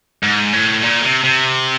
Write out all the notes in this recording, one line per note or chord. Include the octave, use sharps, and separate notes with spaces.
G#2
A2
A#2
C3
C3